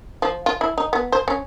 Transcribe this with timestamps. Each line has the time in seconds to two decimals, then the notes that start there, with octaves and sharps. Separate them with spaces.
0.22 F3
0.46 F4
0.61 E4
0.78 D#4
0.93 B3
1.12 C5
1.28 C#4